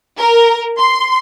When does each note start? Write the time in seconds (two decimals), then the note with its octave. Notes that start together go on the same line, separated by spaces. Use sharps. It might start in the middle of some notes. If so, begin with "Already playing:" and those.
0.17 A#4
0.78 C6